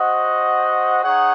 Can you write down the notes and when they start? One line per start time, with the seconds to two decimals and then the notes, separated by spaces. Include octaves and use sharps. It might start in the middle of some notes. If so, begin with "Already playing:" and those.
Already playing: F#4 C5 D#5 F#5
1.03 D#4 G#4 C#5 F#5